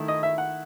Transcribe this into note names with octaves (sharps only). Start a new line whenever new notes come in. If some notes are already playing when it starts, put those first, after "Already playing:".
Already playing: D#3 A3 E4
D#5
E5
F#5